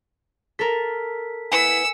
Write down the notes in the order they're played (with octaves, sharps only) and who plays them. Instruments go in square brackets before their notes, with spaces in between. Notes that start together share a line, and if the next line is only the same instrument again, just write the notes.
[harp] A4 A#4 [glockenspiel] B6
[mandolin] B3 E4 [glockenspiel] G#5 C#7 [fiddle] E6